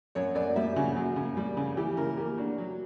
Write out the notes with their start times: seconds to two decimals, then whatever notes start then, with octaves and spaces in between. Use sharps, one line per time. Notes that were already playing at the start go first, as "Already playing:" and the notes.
0.15 F#2 C#5
0.35 F#2 D5
0.56 G3 E5
0.76 C#3 F#4
0.96 F#2
1.16 C#3
1.37 G3
1.57 C#3
1.77 E3 G4
1.97 C#3 A#4
2.17 A#3 G4
2.38 D4 F#4
2.58 F#3